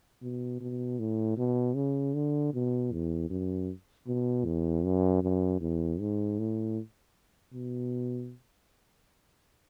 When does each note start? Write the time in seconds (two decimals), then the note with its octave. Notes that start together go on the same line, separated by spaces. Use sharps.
0.22 B2
0.61 B2
0.99 A2
1.37 B2
1.76 C#3
2.14 D3
2.54 B2
2.92 E2
3.30 F#2
4.07 B2
4.45 E2
4.85 F#2
5.23 F#2
5.61 E2
6.00 G#2
6.39 A2
7.54 B2